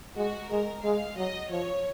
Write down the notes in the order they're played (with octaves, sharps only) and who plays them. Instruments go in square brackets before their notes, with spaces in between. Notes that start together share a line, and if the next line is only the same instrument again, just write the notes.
[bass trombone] G#3 [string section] F#4
[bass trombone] G#3 [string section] A#4
[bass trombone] G#3 [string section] F5
[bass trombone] F#3 [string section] D#5
[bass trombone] F3 [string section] C#5